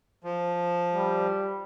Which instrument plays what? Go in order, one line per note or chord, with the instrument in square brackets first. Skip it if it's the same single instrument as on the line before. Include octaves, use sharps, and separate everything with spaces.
[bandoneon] F3
[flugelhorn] G3